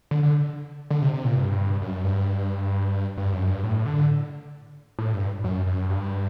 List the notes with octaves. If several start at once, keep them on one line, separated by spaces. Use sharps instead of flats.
D3
D3
D3
C3
C3
A#2
G2
F#2
G2
G2
F#2
G2
A2
D3
A2
G2
F#2
F#2
G2